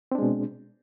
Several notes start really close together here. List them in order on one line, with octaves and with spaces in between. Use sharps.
C4 D4 G#3 B2